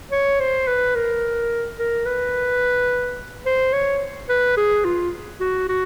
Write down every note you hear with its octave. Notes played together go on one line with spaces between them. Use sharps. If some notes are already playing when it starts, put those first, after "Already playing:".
C#5
C5
B4
A#4
A#4
B4
C5
C#5
B4
G#4
F4
F#4
F#4